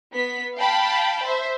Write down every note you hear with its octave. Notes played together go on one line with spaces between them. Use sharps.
B3 B6
F5 G5 A5 B5
C5 E5